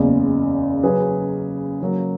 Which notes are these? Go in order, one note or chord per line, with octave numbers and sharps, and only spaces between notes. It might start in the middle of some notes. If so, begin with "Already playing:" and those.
Already playing: F#1 E2 C#3
C#3 F#3 C#4 G#4 B4
C#3 F#3 A#3